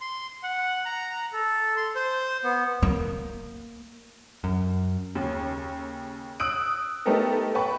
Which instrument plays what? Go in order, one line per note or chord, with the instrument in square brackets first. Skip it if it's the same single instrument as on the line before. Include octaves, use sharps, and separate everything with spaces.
[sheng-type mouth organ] C6
F#5
A#5
A4
C6
C5
B3
[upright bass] A#3
[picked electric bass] F#2
[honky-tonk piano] D#2 C#3
D#6 E6 F#6 D7 F#7
A3 B3 D#4 G4 A4 A#4
B4 G5 A5 B5 C#6